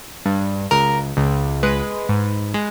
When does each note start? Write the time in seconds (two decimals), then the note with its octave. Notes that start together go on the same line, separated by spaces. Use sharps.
0.25 G2
0.71 C#2 A#4
1.17 C#2
1.63 G#3 B4
2.09 G#2
2.54 G#3